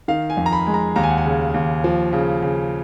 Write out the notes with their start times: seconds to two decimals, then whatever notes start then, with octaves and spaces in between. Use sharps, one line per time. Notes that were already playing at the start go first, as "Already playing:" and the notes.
0.08 D#3 F5
0.30 G#5
0.37 F2
0.46 A#5
0.53 B5
0.67 G#3
0.74 A#5
0.96 D#2 A#5
1.03 G#5
1.10 F#5
1.18 G#5
1.25 C#3
1.54 D#2
1.84 F3
2.13 C#3
2.42 C#3